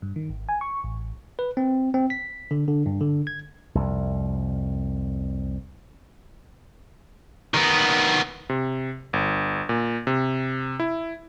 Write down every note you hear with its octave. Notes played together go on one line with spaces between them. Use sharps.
G2
D#3
G#1
G#5
C#6
A1
B4
C4
C4
B6
D3
D3
G2
D3
G#6
C2 F2
D#3 B3
C3
G1
A#2
C3
E4